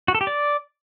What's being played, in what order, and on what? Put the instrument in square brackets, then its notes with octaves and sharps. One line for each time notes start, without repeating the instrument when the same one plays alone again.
[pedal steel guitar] F#4
A4
G4
D5